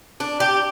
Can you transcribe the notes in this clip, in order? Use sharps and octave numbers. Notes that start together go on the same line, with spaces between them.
D4
G4